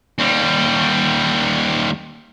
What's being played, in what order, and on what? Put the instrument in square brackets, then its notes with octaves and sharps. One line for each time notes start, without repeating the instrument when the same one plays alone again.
[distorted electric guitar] D#2 G3